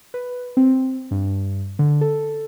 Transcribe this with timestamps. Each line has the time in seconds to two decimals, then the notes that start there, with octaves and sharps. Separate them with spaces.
0.14 B4
0.57 C4
1.11 G2
1.79 D3
2.01 A4